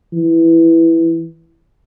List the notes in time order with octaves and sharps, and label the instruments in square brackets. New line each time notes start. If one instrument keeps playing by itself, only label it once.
[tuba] E3